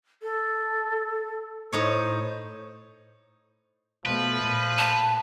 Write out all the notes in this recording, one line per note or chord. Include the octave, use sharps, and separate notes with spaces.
A4
A2 D#4 C5 C#5
B2 F3 A3 B4
A#2
A5